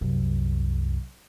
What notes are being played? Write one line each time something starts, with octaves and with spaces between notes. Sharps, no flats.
C2 F#2